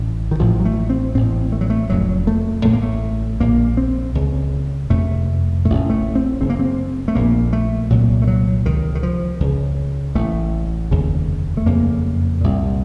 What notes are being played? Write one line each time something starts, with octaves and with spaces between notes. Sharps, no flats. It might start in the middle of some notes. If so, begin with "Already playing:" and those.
Already playing: A1 A2
D#3
A1 A2 F3
F#3
A3
C4
A1 A2 C4
A3
F#3
A3
F1 F2 C#3 F#3
A3
A1 A2 A3
A#3
A3
A#1 A#2 A#3
C4
C#2 C#3
F#1 F2 C3 A3
A1 A2 A3
A3
C4
F#1 F#2 C#3 C4
A#3
C4
A3
A#1 A#2 A#3
A3
C2 A#2 F#3
A3
F#3
C#2 C3 D#3
D#3
F3
C#2 C#3
A1 A2 A3
F1 D#2 C#3
A3
F#1 F2 C#3 A#3
C2 A#2